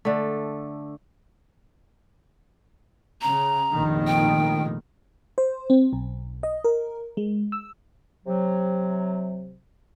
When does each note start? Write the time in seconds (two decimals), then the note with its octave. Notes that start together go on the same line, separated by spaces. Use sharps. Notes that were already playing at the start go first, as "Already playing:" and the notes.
0.05 D3 A3
3.22 C#3 A#5
3.74 F1 A#1 D#3
4.07 G5
5.38 C5
5.70 C4
5.93 B1
6.43 D#5
6.64 A#4
7.17 G#3
7.52 E6
8.25 C3 F#3